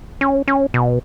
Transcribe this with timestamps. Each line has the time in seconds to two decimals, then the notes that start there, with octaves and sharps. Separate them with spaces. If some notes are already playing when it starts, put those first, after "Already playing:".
0.21 C#4
0.48 C#4
0.74 B2